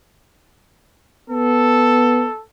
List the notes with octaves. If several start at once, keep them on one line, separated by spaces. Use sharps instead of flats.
B3 A4